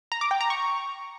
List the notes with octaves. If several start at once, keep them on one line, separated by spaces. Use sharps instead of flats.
A#5
D6
G5
A#5
C#6